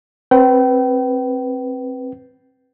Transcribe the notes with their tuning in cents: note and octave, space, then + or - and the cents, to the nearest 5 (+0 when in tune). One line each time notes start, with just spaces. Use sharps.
C4 +20 B4 +0 G5 -35